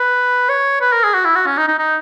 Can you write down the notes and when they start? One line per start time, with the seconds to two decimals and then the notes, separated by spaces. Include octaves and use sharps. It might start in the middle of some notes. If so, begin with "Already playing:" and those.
Already playing: B4
0.49 C#5
0.81 B4
0.92 A#4
1.03 G#4
1.14 F#4
1.25 E4
1.35 F#4
1.46 C#4
1.57 D#4
1.68 D#4
1.79 D#4